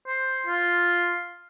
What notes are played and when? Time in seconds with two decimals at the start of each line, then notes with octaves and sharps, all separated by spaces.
0.07 C5
0.46 F4